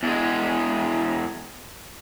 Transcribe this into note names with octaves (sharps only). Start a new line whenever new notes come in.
E2 G#3